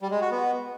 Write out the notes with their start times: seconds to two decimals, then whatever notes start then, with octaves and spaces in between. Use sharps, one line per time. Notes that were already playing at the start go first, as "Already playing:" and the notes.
0.01 G3
0.11 G#3
0.21 F#4
0.31 B3